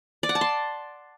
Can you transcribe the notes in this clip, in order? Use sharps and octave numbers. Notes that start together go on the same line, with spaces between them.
D5
F#5
A5
C6